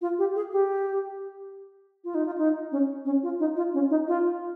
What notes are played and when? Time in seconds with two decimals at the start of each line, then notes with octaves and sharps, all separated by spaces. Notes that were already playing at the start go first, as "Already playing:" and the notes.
0.01 F4
0.19 G4
0.36 G#4
0.52 G4
2.04 F4
2.15 D#4
2.26 F4
2.38 D#4
2.72 C#4
3.05 C#4
3.23 F4
3.39 D#4
3.56 F4
3.74 C#4
3.90 D#4
4.08 F4